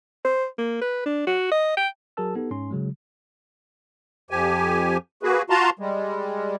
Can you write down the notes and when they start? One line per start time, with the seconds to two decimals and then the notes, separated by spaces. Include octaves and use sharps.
0.24 C5
0.58 A#3
0.81 B4
1.05 D4
1.27 F#4
1.52 D#5
1.77 G5
2.17 F#3 F#4 G#4 A#4 A5 E6
2.35 B3 D#4 G4 A4
2.51 G#2 C#4 C6
2.71 C#3 F#3 G#3
4.31 F2 F3 G4 G#5
5.23 A#3 F#4 G#4 B4
5.50 F4 F#4 F5 A5 A#5 C6
5.79 G3 G#3